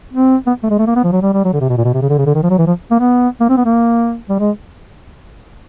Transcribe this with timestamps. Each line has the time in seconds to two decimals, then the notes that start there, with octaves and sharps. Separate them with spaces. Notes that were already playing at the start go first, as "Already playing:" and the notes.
0.13 C4
0.47 B3
0.63 A3
0.70 G#3
0.79 A3
0.87 A#3
0.96 B3
1.04 F3
1.12 F#3
1.22 G3
1.34 G3
1.45 F#3
1.53 D3
1.61 C3
1.69 B2
1.78 A#2
1.85 B2
1.94 C3
2.02 C#3
2.10 D3
2.18 C#3
2.26 D3
2.35 D#3
2.43 F3
2.50 F#3
2.58 E3
2.67 F3
2.91 A#3
3.00 B3
3.40 A#3
3.49 C4
3.57 B3
3.65 A#3
4.29 G3
4.39 G#3